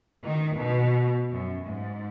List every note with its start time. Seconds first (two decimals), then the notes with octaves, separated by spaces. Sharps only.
0.24 D#3
0.60 B2
1.30 F#2
1.65 G#2